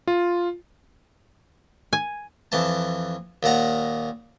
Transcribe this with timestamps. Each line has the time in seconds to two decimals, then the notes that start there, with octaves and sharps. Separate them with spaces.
0.08 F4
1.93 G#5
2.52 F2 E3 A5
3.43 D#2 A#2 F#5 A#5